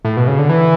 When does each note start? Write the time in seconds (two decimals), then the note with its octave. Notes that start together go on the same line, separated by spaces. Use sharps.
0.05 A2
0.17 B2
0.27 C#3
0.39 D3
0.49 E3